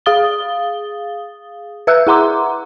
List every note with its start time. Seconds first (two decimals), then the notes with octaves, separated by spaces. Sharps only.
0.06 G#4 F5 D#6 A6 G7
1.87 B4 E5 E6 F#6 G6
2.07 E4 G#4 F#5 A#5 C6 D6